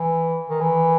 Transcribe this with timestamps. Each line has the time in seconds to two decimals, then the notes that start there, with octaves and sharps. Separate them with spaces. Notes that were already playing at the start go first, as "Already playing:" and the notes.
Already playing: E3
0.50 D#3
0.61 E3